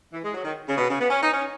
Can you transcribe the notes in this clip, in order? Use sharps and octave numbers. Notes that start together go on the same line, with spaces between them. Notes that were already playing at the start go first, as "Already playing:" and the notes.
E3
G#3
F#3
D#3
C#3
B2
C#3
B3
C#4
D#4
C#4